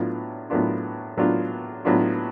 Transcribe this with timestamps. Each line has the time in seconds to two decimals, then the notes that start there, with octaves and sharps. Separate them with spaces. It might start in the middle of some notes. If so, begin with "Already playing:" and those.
Already playing: A2 F#3 B3 D4 F4
0.50 A2 F#3 B3 D4 F4
1.17 A2 F#3 B3 D4 F4
1.85 A2 F#3 B3 D4 F4